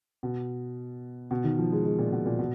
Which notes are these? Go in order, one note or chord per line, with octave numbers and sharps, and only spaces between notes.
B2
B2
D#3
F3
G#3
G#3
A#2
B2
A#2
B2